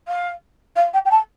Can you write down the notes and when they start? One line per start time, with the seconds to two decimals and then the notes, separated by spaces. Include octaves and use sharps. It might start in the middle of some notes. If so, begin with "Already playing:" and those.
0.08 F5
0.76 F5
0.93 G5
1.05 G5
1.11 A5